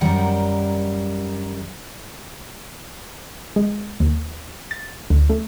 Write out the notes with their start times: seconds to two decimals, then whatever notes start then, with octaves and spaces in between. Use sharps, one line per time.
0.01 F#2 D#3 G3 A#4 F#5
3.56 G#3
4.00 D#2
4.71 A6
5.10 D2
5.30 A3